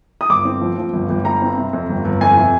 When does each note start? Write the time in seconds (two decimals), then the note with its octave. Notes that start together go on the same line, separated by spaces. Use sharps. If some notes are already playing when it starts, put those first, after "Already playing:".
0.21 D#6
0.29 G1 D6
0.45 C4
0.61 F3
0.78 F3
0.93 G1
1.10 G1
1.25 G2 A#5
1.42 C4
1.58 C3
1.73 F2
1.90 G1
2.05 G1
2.21 F2 G#5
2.37 C3